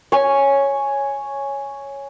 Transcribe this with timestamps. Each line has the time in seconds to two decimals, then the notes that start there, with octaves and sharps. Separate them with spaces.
0.12 C#5 G#5